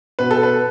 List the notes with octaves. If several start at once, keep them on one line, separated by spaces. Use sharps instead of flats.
B2 B4
A4
B4